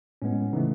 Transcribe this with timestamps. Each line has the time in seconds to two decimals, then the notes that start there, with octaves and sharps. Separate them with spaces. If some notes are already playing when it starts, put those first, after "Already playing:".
0.22 A2 G#3 B3 C#4
0.53 C#3 E3 A3 D#4